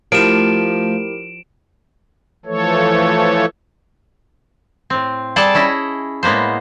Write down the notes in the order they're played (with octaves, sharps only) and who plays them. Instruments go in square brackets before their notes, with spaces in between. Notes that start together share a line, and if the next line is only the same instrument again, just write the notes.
[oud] F3 [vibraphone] A3 [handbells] E4 G4 A#4 [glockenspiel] D7 E7
[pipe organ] E3 F3 A3 A4 C#5
[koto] A2 C4
G3 G#4 A4 D5 A5
C#4 E4 D#5
A2 G#3 A#3 B3 C5